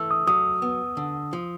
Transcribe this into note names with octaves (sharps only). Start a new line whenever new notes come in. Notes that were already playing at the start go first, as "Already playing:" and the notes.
Already playing: E3 A3 E6
D#6
F#3 D#6
B3
D3
F3